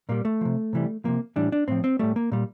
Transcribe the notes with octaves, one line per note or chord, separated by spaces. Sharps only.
A#2 G3 A#3
A3
C3 F3
C3 E3 G3
C3 F3 A#3
A2 E3 G3 D4
D4
A2 F3 C4
C4
A2 G3 A3
A#3
A#2 G3